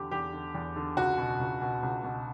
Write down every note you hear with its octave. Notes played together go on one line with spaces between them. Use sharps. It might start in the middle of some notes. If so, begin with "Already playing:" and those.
Already playing: E2 D3 G4
E2 G4
D3
E2
D3
C#2 F#4
B2
C#2
B2
C#2
B2